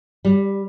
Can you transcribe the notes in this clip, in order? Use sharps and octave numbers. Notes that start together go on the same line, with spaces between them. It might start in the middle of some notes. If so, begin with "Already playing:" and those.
G3